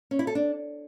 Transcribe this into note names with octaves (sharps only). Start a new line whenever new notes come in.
C#4
E4
A4
D4